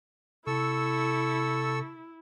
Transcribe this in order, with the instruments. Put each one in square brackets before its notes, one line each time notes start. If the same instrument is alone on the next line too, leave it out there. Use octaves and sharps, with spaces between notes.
[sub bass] C3 [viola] E4 [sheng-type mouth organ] A4 C#6 E6